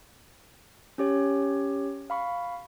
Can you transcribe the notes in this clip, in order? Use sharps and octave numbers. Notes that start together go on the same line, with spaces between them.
C#4 G4 C#5
F5 B5 C#6